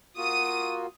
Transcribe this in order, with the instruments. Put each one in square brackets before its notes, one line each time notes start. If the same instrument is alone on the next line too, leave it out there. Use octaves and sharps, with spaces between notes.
[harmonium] A#3 F4 F#4 [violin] D#6 D#7